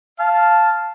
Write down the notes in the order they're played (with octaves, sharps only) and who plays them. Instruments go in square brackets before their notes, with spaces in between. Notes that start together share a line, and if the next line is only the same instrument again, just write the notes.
[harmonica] F5 [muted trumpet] A5